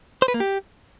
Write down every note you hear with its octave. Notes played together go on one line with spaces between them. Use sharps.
C5
B4
A#3
G4